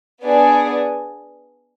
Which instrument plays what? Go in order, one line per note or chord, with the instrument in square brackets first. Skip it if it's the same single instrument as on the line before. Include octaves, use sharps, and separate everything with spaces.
[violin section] B3 D4 G#4 D5